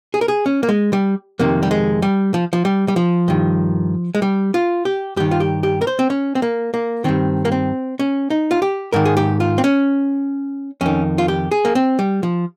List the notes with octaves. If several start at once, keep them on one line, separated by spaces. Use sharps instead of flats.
G#4
A#4
G#4
C#4
A#3
G#3
G3
F2 C3 D#3 A#3
G3
G#3
G3
F3
F3
G3
G3
F3
G2 D#3
G#3
G3
F4
G4
G2 D#3 G4
F4
G4
G4
A#4
C5
C4
C#4
C4
A#3
A#3
G2 D#3 C4
A#3
C4
C#4
D#4
F4
G4
G#2 D#3 A#4
G#4
G4
F4
C4
C#4
F2 D#3 C#4
F4
G4
G#4
A#3
C4
G3
F3